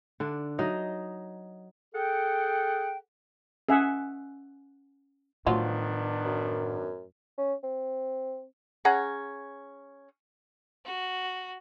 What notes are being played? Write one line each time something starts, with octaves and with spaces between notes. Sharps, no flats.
D3 D4
F#3 D#4 D#5
G#4 A4 F#5 G5
C#4 G#4 E5 F#5
A2 D#3 F3 F#3 B3 D4 F4
F#2
C#4
C4
C#4 G#4 F#5 A#5
F#4